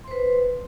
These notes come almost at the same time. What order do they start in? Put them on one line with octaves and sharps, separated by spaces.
C6 C5 B4